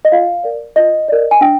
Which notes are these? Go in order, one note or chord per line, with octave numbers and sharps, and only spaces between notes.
D#5
F4 F5
A#4 D5
F4 D#5
A#4 D5
G#5
D4 G5